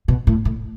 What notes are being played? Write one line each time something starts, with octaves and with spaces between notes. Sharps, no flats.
B2
A2
A2